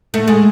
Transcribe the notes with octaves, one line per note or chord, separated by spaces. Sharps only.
A3
G#3